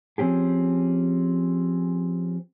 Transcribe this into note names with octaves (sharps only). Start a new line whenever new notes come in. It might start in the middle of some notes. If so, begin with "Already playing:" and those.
F3 C4 C#4 G4 G#4